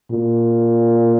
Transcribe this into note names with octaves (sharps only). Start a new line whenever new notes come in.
A#2